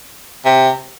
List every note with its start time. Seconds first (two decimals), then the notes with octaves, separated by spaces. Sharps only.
0.45 C3